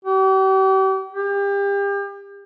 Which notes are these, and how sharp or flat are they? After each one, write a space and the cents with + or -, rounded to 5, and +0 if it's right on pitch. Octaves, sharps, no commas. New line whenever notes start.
G4 -40
G4 +35